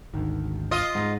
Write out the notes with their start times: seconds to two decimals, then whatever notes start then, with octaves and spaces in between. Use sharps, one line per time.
0.14 G#1 D2 D#3
0.71 F4 D#5
0.95 G#2 A#6